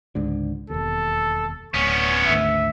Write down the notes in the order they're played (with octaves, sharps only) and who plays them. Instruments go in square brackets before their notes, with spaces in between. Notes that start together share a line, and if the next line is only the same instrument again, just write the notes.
[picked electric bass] C#2 G#2 D3
[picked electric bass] E1 D#2 [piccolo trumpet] A4
[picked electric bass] D1 [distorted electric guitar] B3 C#4 [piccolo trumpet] C#6
[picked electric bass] G#1 D2 [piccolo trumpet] E5